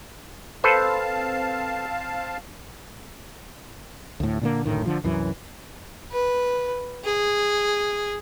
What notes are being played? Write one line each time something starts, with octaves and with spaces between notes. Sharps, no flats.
C4 A4 B4 C5 F5 A5
D2 A2
A#2 D3 A#3
F#1 D2 A2 D#3
D3 F3
C2 F#2 E3
B4
G#4